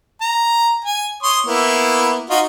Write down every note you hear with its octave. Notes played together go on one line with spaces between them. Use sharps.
A#5
G#5
C#5 C6 D#6
A#3 B3 E4
D#4 F4 F#4